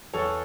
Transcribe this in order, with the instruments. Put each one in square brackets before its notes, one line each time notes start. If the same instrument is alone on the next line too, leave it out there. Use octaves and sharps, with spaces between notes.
[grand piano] E2 A4 C#5